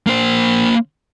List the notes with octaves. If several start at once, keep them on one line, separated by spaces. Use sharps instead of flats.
A#3 C5